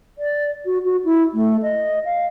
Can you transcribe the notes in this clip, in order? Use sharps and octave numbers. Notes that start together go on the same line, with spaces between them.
D5
F#4
F#4
E4
A3
D#5
F5